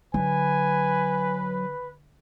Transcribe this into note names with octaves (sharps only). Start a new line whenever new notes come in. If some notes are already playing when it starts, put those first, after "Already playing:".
D3 F#3 B4 G#5